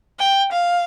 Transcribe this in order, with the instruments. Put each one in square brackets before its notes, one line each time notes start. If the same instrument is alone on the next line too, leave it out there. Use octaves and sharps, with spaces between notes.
[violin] G5
F5